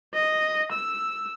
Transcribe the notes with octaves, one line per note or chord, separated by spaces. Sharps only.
D#5
E6